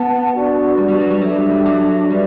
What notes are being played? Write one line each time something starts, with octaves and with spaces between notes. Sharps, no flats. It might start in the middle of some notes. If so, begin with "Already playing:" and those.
Already playing: B3 B4 F#5 A5
D4 F#4 B4 D5
G3
G3
F#3
G3
F#3 D4 A4 E5
G3
G3
F#3
G3 B4 D5